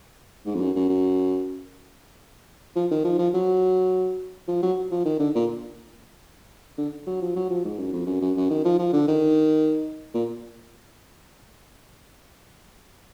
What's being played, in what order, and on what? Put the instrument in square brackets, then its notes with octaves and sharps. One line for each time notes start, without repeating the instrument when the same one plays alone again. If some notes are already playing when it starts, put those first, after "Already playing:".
[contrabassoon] G#2
F2
F#2
F#2
F#2
F3
D#3
F3
F3
F#3
F3
F#3
F3
D#3
D3
A#2
D3
F#3
F3
F#3
F3
G#2
F#2
F2
F#2
F#2
F#2
D#3
F3
F3
D3
D#3
A#2